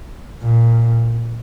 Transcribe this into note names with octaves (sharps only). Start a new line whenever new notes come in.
A#2